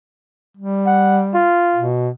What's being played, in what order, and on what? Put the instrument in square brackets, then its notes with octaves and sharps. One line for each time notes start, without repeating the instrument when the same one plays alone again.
[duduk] G3
[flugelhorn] F#5
F4
[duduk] B2